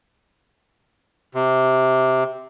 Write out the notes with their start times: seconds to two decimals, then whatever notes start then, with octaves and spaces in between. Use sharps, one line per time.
1.35 C3